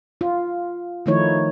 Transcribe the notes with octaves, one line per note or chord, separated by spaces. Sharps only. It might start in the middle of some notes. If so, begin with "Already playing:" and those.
F4
D#3 F3 A3 D#4 E4 C#5